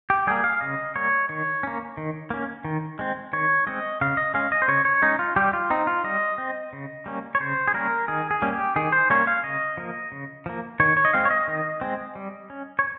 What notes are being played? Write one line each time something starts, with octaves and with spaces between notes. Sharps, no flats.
G4
G3 A#3 G#4
F5
C#3 D#5
G3 A#3 C#5
D#3 C#5
A#3 C#4
D#3
A#3 C#4
D#3
G#3 C4
D#3 C#5
G#3 C4 D#5
C#3 F5
D#5
G#3 C#4 F5
D#5
C5
C#3 C#5
C#5
G#3 C#4 D#4
F4
G3 G4
F4
C4 D#4
F4
G3 D#5
C4
C#3
G3 A#3 C#4
C#5
C#3 C5
G#4
G3 A#3 C#4 A#4
D#3 G#4
G#4
G3 A#3 C#4
G4
D#3 G#4
C5
G3 A#3 C#4 C#5
F5
C#3 D#5
F3 A#3
C#3
F3 A#3
D#3 C#5
C#5
D#5
G#3 C4 F5
C#5
D#5
D#3
G#3 C4
G3
C#4
C#5